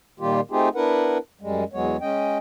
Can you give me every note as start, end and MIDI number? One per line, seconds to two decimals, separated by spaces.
0.20 0.40 46
0.20 0.40 51
0.20 0.40 55
0.20 0.40 58
0.20 0.40 65
0.20 0.40 67
0.51 0.69 57
0.51 0.69 60
0.51 0.69 63
0.51 0.69 65
0.51 0.69 67
0.51 0.69 68
0.75 1.18 59
0.75 1.18 62
0.75 1.18 64
0.75 1.18 70
0.75 1.18 71
0.75 1.18 78
1.41 1.64 42
1.41 1.64 55
1.41 1.64 56
1.73 1.97 40
1.73 1.97 54
1.73 1.97 56
1.73 1.97 59
1.73 1.97 73
2.01 2.38 56
2.01 2.38 61
2.01 2.38 75
2.01 2.38 79